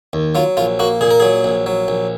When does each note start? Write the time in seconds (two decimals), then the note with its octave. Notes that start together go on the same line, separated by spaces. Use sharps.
0.13 D#2
0.35 F#3 F4
0.57 A#1 F4
0.79 A#3 F#4
1.01 A#2 G#4
1.11 A#4
1.20 F#3 G#4
1.44 A#1
1.66 F#3
1.88 A#1